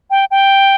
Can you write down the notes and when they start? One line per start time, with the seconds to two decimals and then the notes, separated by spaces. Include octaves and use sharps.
0.11 G5
0.31 G5